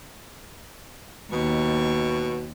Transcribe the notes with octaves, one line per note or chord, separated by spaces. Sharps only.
D#2 B2 C#6